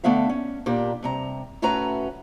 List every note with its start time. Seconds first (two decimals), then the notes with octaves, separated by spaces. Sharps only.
0.04 D3 A3 B3 E5 F5
0.29 C#4
0.66 A#2 D4 G4 A#4
1.03 G2 C3 A#5
1.62 A2 A3 C#4 F#4 B4 A#5